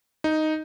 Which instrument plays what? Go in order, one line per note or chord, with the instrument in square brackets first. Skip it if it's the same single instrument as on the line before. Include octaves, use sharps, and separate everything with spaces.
[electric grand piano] D#4